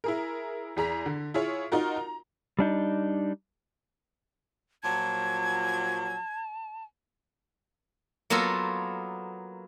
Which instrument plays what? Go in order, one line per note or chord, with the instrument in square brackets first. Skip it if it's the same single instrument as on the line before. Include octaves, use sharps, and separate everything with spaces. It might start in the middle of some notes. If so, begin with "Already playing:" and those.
[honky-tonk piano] E4 G#4 A#4
E2 G#4 A#5 B6
D3
E4 F4 G#4 C#5
D#4 F4 F#4 A#4
A#5
[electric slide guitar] G3 D4 D#4
[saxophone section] A#2 F3 F#3 [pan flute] A5 [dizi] G#6
[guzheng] F#3 A#3 B3 F4 A4